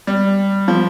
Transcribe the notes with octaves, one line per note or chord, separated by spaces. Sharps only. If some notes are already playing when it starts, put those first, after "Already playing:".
G3
F3